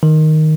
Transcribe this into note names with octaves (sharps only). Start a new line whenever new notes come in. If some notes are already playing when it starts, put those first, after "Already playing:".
D#3